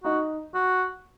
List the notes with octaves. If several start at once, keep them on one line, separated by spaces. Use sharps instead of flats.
D#4 F#4
F#4